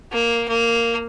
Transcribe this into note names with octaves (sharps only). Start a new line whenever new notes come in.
A#3
A#3